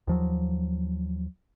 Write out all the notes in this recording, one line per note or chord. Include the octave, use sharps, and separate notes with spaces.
D#2 F3 F#3